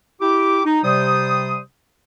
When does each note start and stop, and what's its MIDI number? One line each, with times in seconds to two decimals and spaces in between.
0.20 0.61 64
0.20 0.61 67
0.20 0.61 86
0.65 0.79 63
0.84 1.58 48
0.84 1.58 55
0.84 1.58 72
0.84 1.58 87